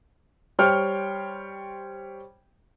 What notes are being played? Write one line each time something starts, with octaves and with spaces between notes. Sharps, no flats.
G3 C5 C#5 G5 F6